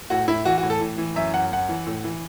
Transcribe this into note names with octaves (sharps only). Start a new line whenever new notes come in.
A2 F#4
A2 E4
E3 F#4
F#4
A2
A4
A2
E3
F#2 E5
F#2 F#5
F#2 F#5
E3
A2
E3